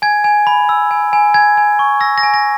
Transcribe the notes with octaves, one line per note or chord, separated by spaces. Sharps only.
G#5 G#6
G#5
B5
E6
G#5
G#5
G#5 G#6
G#5
C#6
E6 A#6
A#6
G#5
A#6